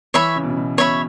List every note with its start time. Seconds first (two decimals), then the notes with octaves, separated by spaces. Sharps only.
0.14 E3 C#5 E5 B5
0.36 C#3
0.43 B2
0.50 C#3
0.57 B2
0.78 B2 C#5 E5 B5